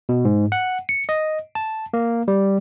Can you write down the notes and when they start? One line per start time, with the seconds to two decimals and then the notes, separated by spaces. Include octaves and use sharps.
0.09 B2
0.25 G#2
0.52 F#5
0.89 C#7
1.09 D#5
1.55 A5
1.93 A#3
2.28 G3